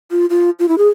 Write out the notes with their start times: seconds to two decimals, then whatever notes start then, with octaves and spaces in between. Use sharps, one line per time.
0.11 F4
0.30 F4
0.59 F4
0.68 E4
0.78 G#4